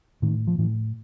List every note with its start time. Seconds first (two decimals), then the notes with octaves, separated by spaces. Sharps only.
0.22 A2 D#3
0.47 F3
0.58 A2 E3